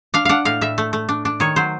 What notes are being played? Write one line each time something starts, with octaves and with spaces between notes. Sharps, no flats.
D4 F5
D4 F5 F#5
A2 F5
A2 E5
A3
A3
D4
D4
D#3 C#5
F#3 C5